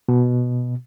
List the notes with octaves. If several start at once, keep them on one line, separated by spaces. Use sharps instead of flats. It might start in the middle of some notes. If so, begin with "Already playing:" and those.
B2